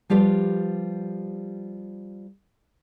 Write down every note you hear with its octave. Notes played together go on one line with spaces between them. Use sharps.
F3 G3 F4 G4 B4